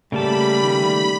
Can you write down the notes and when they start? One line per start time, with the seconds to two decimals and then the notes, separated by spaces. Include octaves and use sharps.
0.12 C#3 G3 A3 A#3 A5 B5
0.63 D#3 A3